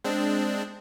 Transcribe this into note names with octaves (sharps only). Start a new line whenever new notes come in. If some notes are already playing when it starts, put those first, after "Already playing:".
G#3 C4 D4